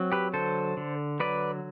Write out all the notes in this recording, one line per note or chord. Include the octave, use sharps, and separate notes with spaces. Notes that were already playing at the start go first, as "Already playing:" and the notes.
Already playing: F#3 C4
G4 B4
D3 A4 C5
D3
F#3 B4 D5